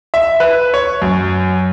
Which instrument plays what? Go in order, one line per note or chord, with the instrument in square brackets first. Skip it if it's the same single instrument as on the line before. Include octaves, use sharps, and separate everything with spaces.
[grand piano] E5
B4
C#5
F#2